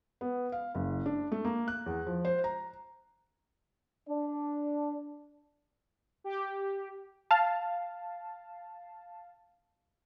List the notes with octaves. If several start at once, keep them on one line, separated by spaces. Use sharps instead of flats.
B3
F5
F#1
D4
A3
A#3
F#6
E2
F3
C5
A#5
D4
G4
F5 A5